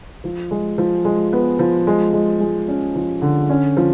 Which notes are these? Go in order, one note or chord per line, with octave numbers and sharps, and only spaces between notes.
F3
G#3
F3
G#3
B3
F3
G#3
G#3
G#3
C#4
F3
D3
C#4
F3